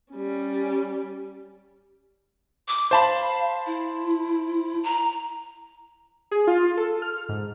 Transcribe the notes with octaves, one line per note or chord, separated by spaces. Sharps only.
G3 C#4
D6
C5 F5 A5 B5
E4
A#5
G#4
F4
A4
F6
G#2